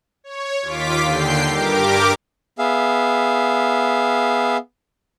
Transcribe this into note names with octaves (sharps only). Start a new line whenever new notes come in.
C#5
D#2 F4 D6 B6
D#2 D3 G5 C7
G2 G4 A#4 D6
B3 G#4 E5 F5